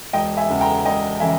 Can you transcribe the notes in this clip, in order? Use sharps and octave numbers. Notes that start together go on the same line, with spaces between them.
E1 D#5 G5
E5 G#5
E2 C#3 E3
G5 A#5
E1 D#5 G5
C#3 E3 E5 G#5